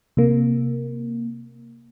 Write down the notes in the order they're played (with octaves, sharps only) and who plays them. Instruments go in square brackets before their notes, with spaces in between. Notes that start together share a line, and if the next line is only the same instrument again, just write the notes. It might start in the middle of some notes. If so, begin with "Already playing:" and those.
[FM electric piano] C3 A#3